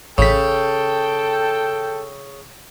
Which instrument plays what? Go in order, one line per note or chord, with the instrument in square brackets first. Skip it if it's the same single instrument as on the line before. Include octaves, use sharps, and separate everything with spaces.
[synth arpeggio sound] A1 B6 [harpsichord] C#3 [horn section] A4 G5